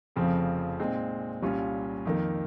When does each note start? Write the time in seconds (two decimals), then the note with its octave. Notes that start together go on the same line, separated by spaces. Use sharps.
0.16 F1 F2 C#3 F3 C4
0.79 A#2 G#3 C4 D#4
1.42 C2 A#2 G3 C#4 F4
2.05 F2 D#3 A#3